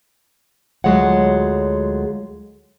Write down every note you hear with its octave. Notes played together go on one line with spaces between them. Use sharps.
D2 F#3 G#3 F4 C#5 F#5